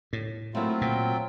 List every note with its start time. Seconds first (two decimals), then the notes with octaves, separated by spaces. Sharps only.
0.13 A2
0.55 F#3 A3 A#3 C4 E4 F4
0.81 A#2 G5